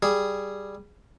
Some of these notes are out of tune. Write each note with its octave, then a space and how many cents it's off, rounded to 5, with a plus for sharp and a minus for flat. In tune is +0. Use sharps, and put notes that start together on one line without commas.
G3 +0 G#4 +0